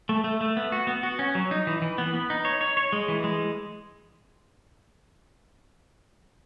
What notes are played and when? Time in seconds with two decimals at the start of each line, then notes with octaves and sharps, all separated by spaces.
0.09 A3
0.24 A3
0.41 A3
0.57 B3
0.72 F#4
0.87 B3
1.03 F#4
1.19 C#4
1.35 F#3
1.51 D#4
1.67 E3
1.82 E3
1.98 B3
2.14 B3
2.30 D#4
2.45 C#5
2.61 C#5
2.77 C#5
2.93 G#3
3.08 E3
3.24 G#3